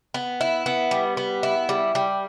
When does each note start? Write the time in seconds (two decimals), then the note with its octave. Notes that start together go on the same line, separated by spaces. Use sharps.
0.14 B3
0.41 E4
0.66 B3
0.91 G3
1.17 B3
1.43 E4
1.69 G3
1.95 G3